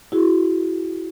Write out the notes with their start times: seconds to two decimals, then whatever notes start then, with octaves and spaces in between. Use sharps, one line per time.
0.12 E4 F#4 G#4